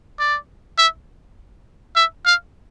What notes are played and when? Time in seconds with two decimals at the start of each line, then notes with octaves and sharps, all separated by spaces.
0.19 D5
0.78 E5
1.96 E5
2.25 F5